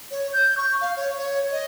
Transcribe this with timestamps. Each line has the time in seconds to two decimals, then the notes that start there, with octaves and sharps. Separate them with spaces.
0.11 C#5
0.33 G6
0.57 C#6
0.81 F5
0.97 C#5
1.18 C#5
1.52 D#5